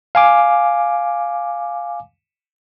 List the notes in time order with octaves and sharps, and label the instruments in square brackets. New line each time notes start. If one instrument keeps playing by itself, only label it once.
[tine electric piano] F5 G#5 D6